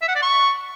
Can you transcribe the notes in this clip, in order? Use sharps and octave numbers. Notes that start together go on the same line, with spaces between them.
E5
F#5
D5
C#6